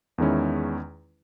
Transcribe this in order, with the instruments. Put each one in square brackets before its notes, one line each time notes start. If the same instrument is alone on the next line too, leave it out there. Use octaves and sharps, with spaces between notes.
[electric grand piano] E2 D#3 G#3 C#4 E4